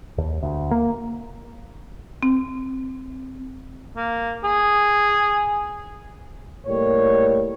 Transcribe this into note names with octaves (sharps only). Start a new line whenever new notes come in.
D#2
D2
A#3
C4
A#3
G#4
A2 G3 A#3 C#5